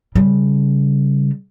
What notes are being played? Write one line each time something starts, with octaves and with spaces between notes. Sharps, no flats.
C#3 G3